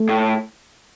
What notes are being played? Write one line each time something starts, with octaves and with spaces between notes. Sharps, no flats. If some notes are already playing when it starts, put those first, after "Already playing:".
Already playing: A3
A2